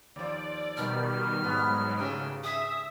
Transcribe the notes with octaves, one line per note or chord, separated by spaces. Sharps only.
D#2 F3 D5
B2 D#3 G3 F6
G#2 F#3 B3
C#3 A3 D4 G4
G#4 E5 D#6